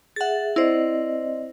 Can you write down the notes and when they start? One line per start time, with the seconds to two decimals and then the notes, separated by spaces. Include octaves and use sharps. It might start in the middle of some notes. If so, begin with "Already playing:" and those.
0.16 G#4 E5 F#5 A6
0.56 C4 E4 C5 D5 D#5